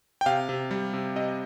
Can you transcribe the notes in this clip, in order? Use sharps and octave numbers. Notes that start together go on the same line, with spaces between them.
G5
C3 F5
C3
G3
C3
C3 D#5